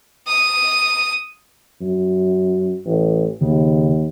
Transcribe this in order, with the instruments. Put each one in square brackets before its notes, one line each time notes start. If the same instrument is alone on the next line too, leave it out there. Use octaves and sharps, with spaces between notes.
[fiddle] D#6
[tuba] F#2
A1
[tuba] D#2 [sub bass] C#3